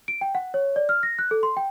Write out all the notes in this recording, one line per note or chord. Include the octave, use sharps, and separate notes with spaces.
D7
G5
F#5
C#5
D5
F6
A#6
F#6
A4
C6
G5